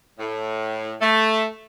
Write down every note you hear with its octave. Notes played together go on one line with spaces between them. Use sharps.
A2
A3